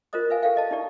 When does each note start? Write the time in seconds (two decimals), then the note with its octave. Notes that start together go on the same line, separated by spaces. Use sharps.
0.13 F4 A#4 C5 D#5 D#6
0.30 B4 E5 F5 G5 G#5
0.42 G4 A4 D5 E5 F5 G5
0.55 A4 D#5 A5
0.71 D#4 E4 G4 D5